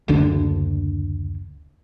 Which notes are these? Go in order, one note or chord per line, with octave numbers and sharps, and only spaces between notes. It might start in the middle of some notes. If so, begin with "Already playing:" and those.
F#1 D2 D3 D4